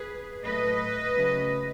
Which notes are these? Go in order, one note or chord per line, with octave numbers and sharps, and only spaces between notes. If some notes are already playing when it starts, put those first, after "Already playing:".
Already playing: G#4 B4
A2 F#3 A3 B4 D#5
C#3 F#3 A3